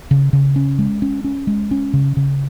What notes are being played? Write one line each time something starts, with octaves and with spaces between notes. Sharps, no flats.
C#3
C#3
C#4
G#3
C#4
C#4
G#3
C#4
C#3
C#3